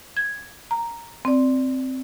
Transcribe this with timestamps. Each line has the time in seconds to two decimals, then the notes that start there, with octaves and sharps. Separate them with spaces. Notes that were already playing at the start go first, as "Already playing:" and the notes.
0.17 G#6
0.71 A#5
1.25 C4 D5